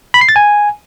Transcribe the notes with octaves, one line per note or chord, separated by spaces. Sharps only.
B5
C7
A6
G#5